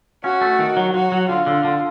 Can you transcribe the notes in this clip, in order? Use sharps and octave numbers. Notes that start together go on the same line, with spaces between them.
C#4 F#4
A3
D#3
F#3
F#3 F#4
F#3
D3 F4
D3
D3